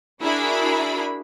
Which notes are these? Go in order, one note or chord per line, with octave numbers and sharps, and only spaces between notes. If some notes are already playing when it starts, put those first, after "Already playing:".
D4 E4 F#4 G#4 A#4 B5